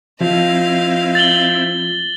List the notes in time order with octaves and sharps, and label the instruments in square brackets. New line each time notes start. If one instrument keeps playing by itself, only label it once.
[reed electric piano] F3 F4 [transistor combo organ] C4 E4 [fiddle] D#5 F5
[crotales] A6 F#7 G7